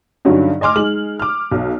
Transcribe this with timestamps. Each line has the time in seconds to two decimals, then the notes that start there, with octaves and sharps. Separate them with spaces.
0.25 G2 D3 F#3 C#4 D#4
0.61 D#5 G#5 C6 D6 F6
0.76 G#3 D#4 F6 F#7
1.19 D6 F6
1.52 B1